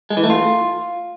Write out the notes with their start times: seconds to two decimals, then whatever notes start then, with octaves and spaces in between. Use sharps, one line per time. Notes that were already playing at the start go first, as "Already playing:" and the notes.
0.10 G#3
0.17 E3
0.23 A3
0.30 F4